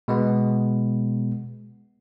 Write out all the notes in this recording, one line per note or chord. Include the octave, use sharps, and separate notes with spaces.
B2 G#3 B3